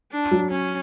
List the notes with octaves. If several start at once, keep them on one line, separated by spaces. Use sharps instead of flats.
D4
F#3
C#4